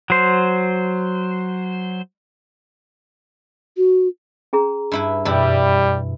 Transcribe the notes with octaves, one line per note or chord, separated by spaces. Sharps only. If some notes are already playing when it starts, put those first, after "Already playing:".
F#3 C5
F#4
C#4 G#4 A#5
G2 E4 B4
F#2 B2 E3 G3 E4